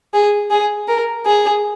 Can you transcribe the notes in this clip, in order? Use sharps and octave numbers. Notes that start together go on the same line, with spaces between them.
G#4
G#4
A#4
G#4